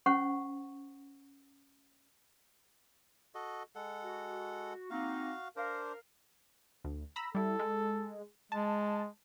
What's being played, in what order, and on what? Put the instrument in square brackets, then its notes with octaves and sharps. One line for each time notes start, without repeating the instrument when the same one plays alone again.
[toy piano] C#4 C5 F#5 C#6
[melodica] F#4 A4 D#5
G#3 A4 F#5
[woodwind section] F#4
[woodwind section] A#3 C4 D#4 [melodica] F#4 F5
[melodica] D4 C5 [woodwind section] A#4 F5
[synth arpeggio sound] D2
A#5 B5 E6
[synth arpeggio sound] G3 E4 [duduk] A4
[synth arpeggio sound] G#3
[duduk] G#3 [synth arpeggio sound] A5